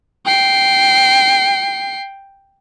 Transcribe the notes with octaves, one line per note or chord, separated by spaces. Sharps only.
G5 C7